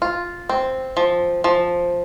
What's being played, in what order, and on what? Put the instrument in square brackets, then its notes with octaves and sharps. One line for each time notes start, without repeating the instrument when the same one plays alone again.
[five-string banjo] F4
C4
F3
F3